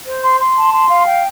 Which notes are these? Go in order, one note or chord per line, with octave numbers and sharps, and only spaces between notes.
C5
C6
C6
A5
C6
F5
G5